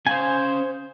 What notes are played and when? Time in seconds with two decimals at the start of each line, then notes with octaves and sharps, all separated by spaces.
0.07 C#4 C5 F5 G#5